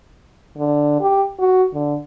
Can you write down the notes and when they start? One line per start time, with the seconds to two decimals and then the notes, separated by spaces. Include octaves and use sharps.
0.57 D3
1.01 G4
1.39 F#4
1.73 D3